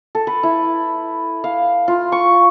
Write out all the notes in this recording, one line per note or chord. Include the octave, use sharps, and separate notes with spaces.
A4
B4
E4
F5
F4
C#6